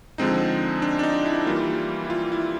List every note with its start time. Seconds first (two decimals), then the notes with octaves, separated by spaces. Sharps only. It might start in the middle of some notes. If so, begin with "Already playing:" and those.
0.18 D3 F3 G#3 C4 D#4
0.82 D4
0.99 D4
1.03 D#4
1.26 E4
1.46 E3 G3 A#3 F4
2.05 E4
2.10 F4
2.32 E4